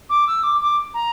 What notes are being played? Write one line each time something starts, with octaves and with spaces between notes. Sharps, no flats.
D6
E6
D6
D6
A#5